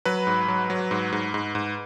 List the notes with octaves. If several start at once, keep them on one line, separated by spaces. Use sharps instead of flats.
F#3 B4 B5
G#2
F#3
F#3
G#2
G#2
G#2
G#2